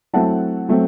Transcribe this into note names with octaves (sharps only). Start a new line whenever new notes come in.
F#3 A3 C4 E4 F#5 A5
F#3 A3 C4